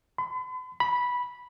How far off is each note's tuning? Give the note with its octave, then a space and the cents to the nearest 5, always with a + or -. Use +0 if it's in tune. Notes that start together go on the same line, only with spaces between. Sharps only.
B5 +45
B5 -10